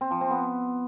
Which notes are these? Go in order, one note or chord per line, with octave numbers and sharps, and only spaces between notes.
C4
F3
C4
B3